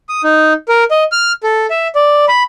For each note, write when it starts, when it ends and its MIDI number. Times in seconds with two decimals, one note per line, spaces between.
0.09 0.22 87
0.24 0.53 63
0.69 0.84 70
0.91 1.04 75
1.12 1.32 89
1.43 1.66 69
1.71 1.88 76
1.95 2.25 74
2.28 2.43 83